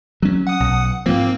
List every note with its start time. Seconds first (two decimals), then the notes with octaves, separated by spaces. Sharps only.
0.23 F#3 C#4
0.47 F#5 D#6
0.60 B1
1.06 G#2 F3 A#3 C4